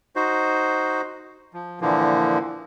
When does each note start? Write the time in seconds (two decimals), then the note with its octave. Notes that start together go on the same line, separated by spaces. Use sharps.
0.16 D#4 F#4 C5
1.54 F3
1.81 A#2 D3 E3 F3 A#3